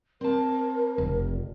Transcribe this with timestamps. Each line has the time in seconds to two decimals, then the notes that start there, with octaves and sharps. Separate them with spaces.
0.21 C4 A#4 A5
0.98 F1